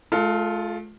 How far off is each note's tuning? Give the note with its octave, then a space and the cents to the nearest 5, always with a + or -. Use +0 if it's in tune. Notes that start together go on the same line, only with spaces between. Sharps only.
A3 -45 F4 +0 A4 +20